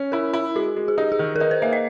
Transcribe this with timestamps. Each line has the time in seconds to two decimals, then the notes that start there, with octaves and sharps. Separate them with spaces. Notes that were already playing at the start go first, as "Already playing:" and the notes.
Already playing: C#4
0.12 E4 A#4
0.34 E4
0.55 G#3 F#4
0.76 G#3
0.88 G#4
0.98 D#4 G4
1.12 G#4
1.19 D#3
1.36 A#4
1.40 D#4 B4
1.51 C5
1.62 A#3 E5
1.73 D#5